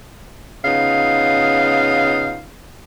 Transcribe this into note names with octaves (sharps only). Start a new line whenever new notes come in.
C#3 B3 D#4 F4 F5